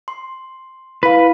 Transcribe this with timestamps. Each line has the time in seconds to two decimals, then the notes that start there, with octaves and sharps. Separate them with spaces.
0.08 C6
1.03 E4 B4 F5